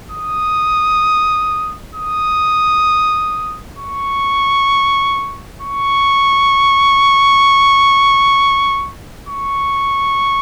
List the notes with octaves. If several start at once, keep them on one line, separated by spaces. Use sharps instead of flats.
D#6
D#6
C#6
C#6
C#6